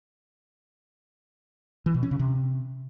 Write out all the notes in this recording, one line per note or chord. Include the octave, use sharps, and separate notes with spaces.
E3
B2
C#4
C#3
C3